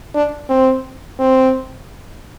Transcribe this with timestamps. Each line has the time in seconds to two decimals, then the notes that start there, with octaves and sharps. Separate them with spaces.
0.15 D4
0.49 C4
1.19 C4